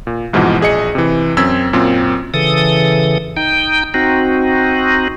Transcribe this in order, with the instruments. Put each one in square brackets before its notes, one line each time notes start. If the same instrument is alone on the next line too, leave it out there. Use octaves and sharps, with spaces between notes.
[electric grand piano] A#2
C2 G#2 B2 E3 F3
A#1 G#4 D#5 C#7
C3 E3
F#2 C4 E6 G#6 B6
F#2 A#2 C4
[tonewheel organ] C#3 E3 A4 D#6
D#4 G5
C4 D#4 F#4